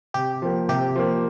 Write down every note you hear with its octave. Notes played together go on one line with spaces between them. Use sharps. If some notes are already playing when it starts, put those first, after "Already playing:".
C3 G4
F3 A#3
C3 G4
F3 A#3